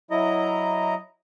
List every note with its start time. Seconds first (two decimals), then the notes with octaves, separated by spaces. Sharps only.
0.11 F#3 E4 D#5 A#5